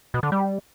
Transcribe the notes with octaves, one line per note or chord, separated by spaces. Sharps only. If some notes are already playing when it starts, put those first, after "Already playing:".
B2
D3
G3